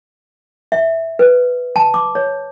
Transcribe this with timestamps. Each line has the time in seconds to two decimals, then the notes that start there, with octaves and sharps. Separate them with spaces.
0.72 E5
1.19 B4
1.76 A5
1.94 D6
2.15 C#5